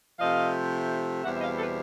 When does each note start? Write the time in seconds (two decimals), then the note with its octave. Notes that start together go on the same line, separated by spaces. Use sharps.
0.19 C3 F3 A3 D#5 F5
1.23 E2 B2 G3 C4 E5 F#5
1.36 E5
1.41 D#5 F5
1.58 A4 B4